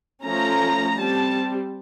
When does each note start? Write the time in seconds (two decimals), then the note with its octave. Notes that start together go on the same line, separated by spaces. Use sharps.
0.22 F3 A3 C#4 A#5
0.96 G3 C4 A5